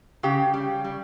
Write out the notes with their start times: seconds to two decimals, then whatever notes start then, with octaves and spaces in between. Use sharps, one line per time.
0.23 C#3 G4
0.54 G3
0.84 G3